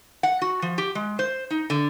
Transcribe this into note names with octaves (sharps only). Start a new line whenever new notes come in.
F#5
F#4
F3
G4
G#3
C5
D#4
D3